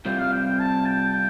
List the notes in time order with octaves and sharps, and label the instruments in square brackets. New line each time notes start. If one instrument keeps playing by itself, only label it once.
[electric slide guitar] C3 G3 C4 F4 [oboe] G5
[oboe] F5
G5
G5
A5
G5
G5